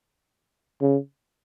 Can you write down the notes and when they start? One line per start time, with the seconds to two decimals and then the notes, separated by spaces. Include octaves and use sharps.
0.82 C#3